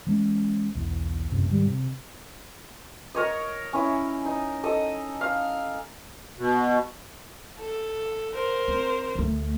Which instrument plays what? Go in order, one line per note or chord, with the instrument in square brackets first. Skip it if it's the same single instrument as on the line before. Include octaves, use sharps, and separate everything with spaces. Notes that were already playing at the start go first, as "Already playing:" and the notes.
[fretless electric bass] E3 G#3 C#4
B1 E2
A1 F#2 C3
G#2 D#3 G3
C3
[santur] A#4 C#5 D#5
C#4 E4
D#4
A4 D#5
F5
[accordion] B2
[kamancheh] A4
A#4 C5
[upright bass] C4
D2 A3